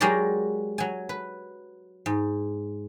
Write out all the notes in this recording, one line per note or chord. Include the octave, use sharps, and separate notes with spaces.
F#3 G#3 F#4 G4 A#4 D5
F#3 G#5
B4
G#2